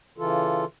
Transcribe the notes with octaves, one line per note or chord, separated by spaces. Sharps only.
C#3 E3 F4 A4